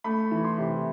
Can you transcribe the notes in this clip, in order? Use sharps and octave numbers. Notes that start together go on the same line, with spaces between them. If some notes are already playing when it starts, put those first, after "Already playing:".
A3 B5
E3
C6
C3